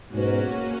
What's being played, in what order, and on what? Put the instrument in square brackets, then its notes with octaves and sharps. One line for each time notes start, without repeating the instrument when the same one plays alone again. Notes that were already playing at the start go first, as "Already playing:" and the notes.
[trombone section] G#2 B2 [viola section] A#3 C#4 F#4